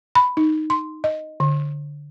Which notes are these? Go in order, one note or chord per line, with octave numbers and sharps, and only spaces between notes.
B5
D#4
C6
D#5
D3